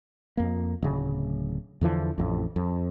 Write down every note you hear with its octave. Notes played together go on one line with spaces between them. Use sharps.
F2 A#3
D1 C#3
E2 D3 E3 F3
A1 F2
F2